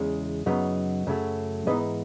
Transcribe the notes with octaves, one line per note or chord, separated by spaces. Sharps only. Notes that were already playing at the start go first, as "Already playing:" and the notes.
Already playing: E2 C#3 G#3
F#2 C#3 F#3 B3 D#4
F#2 C#3 F#3 A3
G#2 E3 B3 D#4 B4 D#5